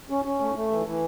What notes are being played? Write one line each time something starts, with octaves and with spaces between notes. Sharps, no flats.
C#4
C#4
A3
A3
E3
E3